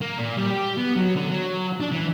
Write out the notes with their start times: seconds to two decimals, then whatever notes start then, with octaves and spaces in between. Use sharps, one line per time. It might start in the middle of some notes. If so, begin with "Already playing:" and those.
0.01 A#3
0.18 A#2
0.37 G3
0.50 G4
0.77 B3
0.96 F#3
1.16 D3
1.30 F#3
1.80 D4
1.92 E3